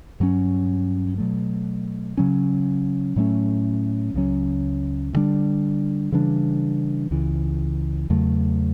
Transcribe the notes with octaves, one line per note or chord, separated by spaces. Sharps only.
G2 F#3 C#4
B2 F#3 A3
C#3 F#3 C#4
A2 F#3 A3 C#4
C#2 C#3 F#3 C#4
D2 D3 G3 D4
C#3 E3 G3 D4
C#2 C#3 E3
E2 C#3 F#3 A3